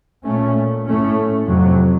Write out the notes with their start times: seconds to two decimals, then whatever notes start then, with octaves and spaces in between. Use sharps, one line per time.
0.25 A#2 A3 C#4
0.87 A2 A3 C#4
1.48 F2 C3 F#3